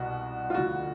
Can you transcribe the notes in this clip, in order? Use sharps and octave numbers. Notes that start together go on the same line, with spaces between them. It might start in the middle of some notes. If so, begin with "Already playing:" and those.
Already playing: C2 B2 F#4
F4
D2 D3 F3 F#4